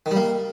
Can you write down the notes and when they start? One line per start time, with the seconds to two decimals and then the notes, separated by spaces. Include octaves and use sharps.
0.06 D#3
0.11 G3
0.16 A#3